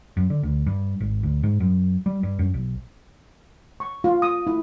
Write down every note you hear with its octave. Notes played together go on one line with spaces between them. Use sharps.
F#2
D3
D2
G2
G#1
D2
G#2
F#2
G3
G2
F#2
B1
C#6
F4
D#6
E4